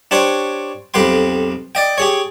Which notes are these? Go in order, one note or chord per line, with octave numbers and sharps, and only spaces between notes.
D4 G4 C5 C#5
B1 F2 G4 B4 G5 C6
D5 D#5 G5
G4 G#4 C#5